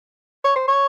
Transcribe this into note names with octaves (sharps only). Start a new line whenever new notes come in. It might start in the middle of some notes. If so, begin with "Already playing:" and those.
C#5
C5
C#5